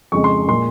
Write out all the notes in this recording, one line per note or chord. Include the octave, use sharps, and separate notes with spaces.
F2 C#3 G#3 C#6
C6
A#2 G#3 C6